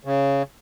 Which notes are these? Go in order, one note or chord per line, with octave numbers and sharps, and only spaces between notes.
C#3